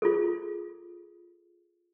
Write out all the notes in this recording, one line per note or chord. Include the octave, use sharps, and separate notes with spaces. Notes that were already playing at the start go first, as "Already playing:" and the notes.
F4 G#4 A4